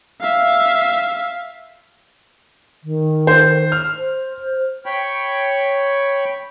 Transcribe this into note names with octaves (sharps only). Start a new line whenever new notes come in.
E5 F5
D#3
C5
F6
C5
C#5 G5 B5